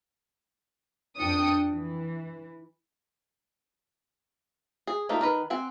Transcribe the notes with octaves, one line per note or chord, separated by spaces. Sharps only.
F2 D4 G5 D#6 C#7
E3
G#4
A3 A#3 D#4 F4 G4
D#3 A#4 B4
C4 F#5 G#5